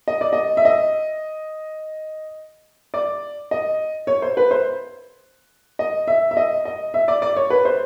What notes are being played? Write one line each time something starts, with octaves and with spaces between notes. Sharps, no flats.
D#5
D5
D#5
E5
D#5
D5
D#5
C#5
C5
B4
C5
D#5
E5
E5
D#5
D#5
E5
D5
D5
C#5
B4
C5